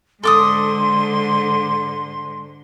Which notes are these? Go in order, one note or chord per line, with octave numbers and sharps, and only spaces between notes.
G#2 D3 A4 C6 D6 D#6